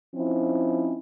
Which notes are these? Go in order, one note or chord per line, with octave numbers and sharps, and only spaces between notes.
F3 C4 C#4 D#4 E4